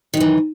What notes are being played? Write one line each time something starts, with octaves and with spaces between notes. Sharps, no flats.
F#2 D#3 E3